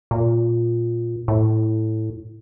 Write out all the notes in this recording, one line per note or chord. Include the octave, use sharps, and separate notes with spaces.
A#2
A2